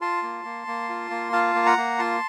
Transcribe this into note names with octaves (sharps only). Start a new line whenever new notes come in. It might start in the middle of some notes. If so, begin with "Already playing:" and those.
F4 A5 C6
A#3
A#3
A#3
F4
A#3
F4 F5 A5
A#3
F#5 A#5
A#3
F4 A5 C6